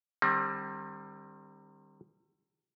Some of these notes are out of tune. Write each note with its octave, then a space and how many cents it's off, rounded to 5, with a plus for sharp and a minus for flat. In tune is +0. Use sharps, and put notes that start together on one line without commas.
D#3 -35 G3 +20 C4 +35